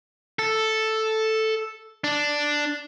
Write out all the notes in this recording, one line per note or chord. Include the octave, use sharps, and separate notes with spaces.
A4
D4